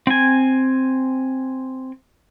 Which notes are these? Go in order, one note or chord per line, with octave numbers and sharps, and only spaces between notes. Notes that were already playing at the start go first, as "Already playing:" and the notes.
C4 G#5